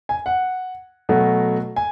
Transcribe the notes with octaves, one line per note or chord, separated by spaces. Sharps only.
G#5
F#5
B2 F#3 A3
G#5